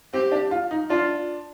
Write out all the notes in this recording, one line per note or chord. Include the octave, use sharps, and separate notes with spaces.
C4 G4
D4
F4
D#4
D4 F4